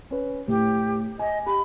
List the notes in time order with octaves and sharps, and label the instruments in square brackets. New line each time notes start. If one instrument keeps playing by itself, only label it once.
[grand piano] C#4 B4
[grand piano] A2 [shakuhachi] G4
[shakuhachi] D#5 [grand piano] G#5
[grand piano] G4 [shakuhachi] B5